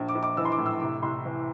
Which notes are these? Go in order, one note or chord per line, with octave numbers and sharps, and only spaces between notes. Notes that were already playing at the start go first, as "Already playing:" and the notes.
Already playing: A#1
D6
A#1
D6
E3 E6
C6
D6
A2
E6
C2 D6
C2 C6
E3